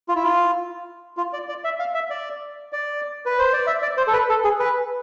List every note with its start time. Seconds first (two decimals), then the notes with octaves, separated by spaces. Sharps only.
0.08 F4
0.16 E4
0.23 F4
1.17 F4
1.33 D5
1.49 D5
1.64 E5
1.79 F5
1.94 E5
2.10 D5
2.73 D5
3.26 B4
3.39 C5
3.53 D5
3.67 E5
3.82 D5
3.97 C5
4.07 A4
4.13 B4
4.29 A4
4.44 G#4
4.60 B4